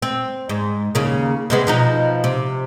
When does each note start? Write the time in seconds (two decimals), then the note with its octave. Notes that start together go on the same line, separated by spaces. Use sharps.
0.02 C4
0.49 G#2
0.95 D#2 C#3 A#3
1.50 C3 G#3 B3
1.67 B2 F3 D#4
2.24 C3